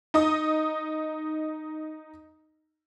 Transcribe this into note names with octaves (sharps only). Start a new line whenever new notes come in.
D#4 D#5 D#6